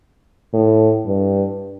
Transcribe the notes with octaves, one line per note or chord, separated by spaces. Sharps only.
A2
G2